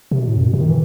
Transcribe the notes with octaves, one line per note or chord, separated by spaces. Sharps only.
C3
B2
A2
F#2
B2
C3
D#3
E3